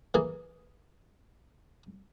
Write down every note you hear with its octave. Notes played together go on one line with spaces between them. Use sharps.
E3 A#3 G#4